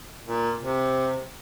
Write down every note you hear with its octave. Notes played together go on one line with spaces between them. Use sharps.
A#2
C3